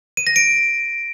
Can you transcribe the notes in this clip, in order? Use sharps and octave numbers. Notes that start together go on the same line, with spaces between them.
D#7
A#6
D7